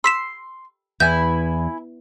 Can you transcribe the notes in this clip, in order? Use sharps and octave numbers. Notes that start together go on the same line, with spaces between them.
C6 E6 B6 E7
E2 E4 G#5 G6